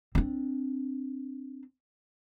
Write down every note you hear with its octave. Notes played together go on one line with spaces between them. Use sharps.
C4 D4